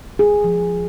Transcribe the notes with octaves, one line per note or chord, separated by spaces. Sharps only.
G#4
F3